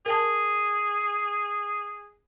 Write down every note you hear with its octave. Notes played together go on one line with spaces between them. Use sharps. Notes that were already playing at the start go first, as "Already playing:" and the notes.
G#4 A#4 G5 A5